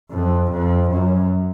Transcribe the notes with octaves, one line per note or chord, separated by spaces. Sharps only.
F2
F2
F#2